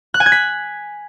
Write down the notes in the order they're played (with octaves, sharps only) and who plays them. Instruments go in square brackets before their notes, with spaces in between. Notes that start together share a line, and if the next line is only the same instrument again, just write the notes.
[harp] F#6
G#5
G#6
B6